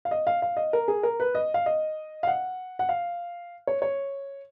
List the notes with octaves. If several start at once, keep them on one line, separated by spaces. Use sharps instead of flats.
F5
D#5
F5
F5
D#5
A#4
G#4
A#4
B4
D#5
F5
D#5
F5
F#5
F#5
F5
C#5
C#5